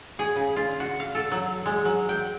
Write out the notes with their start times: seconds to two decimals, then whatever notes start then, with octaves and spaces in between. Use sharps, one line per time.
0.19 G#4
0.36 C#3
0.56 F4
0.80 F#4
1.00 F5
1.15 A4
1.32 F#3
1.66 G#3
1.85 F#3
2.09 G5